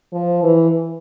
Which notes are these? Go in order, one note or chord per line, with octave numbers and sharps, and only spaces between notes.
F3
E3